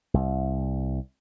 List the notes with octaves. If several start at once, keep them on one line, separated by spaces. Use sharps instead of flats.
C2